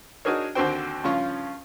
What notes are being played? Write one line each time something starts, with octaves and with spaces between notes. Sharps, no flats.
D4 D#4 F#4 G#4 A#4 C#5
D#2 D3 C4 F#4 C5 G5
G2 C#3 F3 C#4 F4 C#6